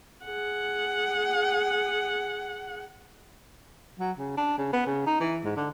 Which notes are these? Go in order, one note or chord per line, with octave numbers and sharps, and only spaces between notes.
G#4 F#5
F#3
C#3
D4
C#3
B3
C#3
D#4
E3
G#2
D3